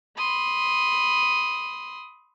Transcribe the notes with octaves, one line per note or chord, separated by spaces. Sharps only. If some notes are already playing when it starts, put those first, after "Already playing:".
B5 C6 D#6